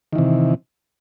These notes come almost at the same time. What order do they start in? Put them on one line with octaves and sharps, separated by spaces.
D#3 E3 C3